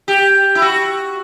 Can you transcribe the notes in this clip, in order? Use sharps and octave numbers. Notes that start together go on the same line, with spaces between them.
G4
E4
F#4